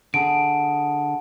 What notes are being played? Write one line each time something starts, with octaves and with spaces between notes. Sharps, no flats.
D3 G#4 F#5 A5 D7